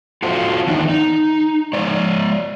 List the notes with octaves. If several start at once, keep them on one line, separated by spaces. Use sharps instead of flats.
F4 F#4 A4 C5
D#3 E3 B3 D4 D#4
D#4
G#3 C#5 D5